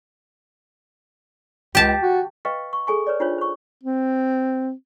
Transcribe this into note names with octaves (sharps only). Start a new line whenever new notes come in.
C#2 G4 A5
F#4
B4 D#5 F5 G5 C#6
C#6
G#4 A4 G#5 C#6
B4 C#5 D5
D4 D#4 F4 F#4 C5 C#5
C5 C#6
C4